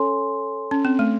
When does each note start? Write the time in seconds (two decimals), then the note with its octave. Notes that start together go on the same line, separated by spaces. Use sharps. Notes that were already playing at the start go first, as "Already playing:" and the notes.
Already playing: C#4 A4 C#5 G#5 C6
0.71 C#4
0.85 C4
0.99 A3